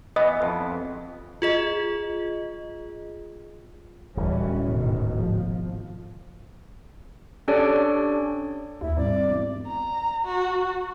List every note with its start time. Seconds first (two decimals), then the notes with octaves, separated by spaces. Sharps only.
0.16 E3 B3 D#5
0.42 F2
1.42 F4 G#4 D#5
4.17 D1 E3 G3 C#4
4.68 G#2 B2 D#3
5.14 G#1 F3
7.48 C#4 D4 G4 A4 C#5 D5
8.81 D#2 E4
8.97 C2 G#2 D5
9.26 E1
9.67 A#5
10.25 F#4